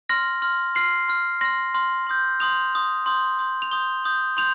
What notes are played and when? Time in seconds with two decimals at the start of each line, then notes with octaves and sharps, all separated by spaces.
0.09 C6 F6 A#6
0.42 C6 F6
0.75 C6 F6 C7
1.08 C6 F6
1.41 C6 F6 A#6
1.74 C6 F6
2.07 C6 D#6 G6
2.40 C6 D#6 G6 F7
2.73 C6 D#6 G6
3.06 C6 D#6 G6
3.39 C6 D#6 G6
3.62 F7
3.71 C6 D#6 G6 G7
4.04 C6 D#6 G6
4.37 C6 D#6 G6 F7